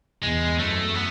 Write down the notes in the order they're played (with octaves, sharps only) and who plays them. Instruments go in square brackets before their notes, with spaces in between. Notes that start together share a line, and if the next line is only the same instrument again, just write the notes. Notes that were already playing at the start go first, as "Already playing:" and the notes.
[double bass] E2 [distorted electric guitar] G#3
[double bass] F#2 [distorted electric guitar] A3
[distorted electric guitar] B3